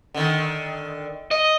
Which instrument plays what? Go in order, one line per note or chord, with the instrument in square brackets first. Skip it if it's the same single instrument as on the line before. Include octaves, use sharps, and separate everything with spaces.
[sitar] D3 D#3
[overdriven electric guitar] D#5